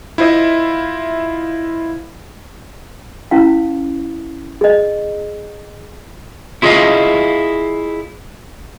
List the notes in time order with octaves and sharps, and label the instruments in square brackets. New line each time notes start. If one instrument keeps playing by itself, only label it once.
[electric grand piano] E4 F4 C5 D#5 E5
[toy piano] C#4 E4 F5
G#4 D#5
[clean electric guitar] E4 F4 G#4 A4 D#5 F5